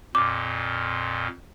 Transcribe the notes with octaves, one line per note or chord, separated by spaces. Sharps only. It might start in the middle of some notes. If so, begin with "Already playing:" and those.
F2 A#2 D6